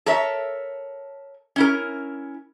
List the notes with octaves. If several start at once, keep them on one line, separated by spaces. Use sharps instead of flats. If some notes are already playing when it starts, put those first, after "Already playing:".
A4 A#4 C#5 E5
C#4 E4 A#4